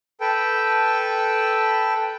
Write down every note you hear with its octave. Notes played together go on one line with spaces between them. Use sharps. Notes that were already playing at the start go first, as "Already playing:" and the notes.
A4 B4 G5